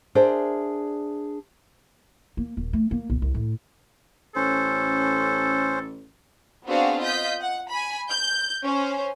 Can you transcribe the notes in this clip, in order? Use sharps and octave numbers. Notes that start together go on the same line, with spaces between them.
D4 G#4 A#4 C5 D5 E5
A#3
D#1
A3
A#3
B1
C2
A2
A1 C#4 A4 C5
B3 C4 D4 F#4 G#4 F5
F4 D#5 G6 B6
F#5
G#5 B5
G6
C#4 C5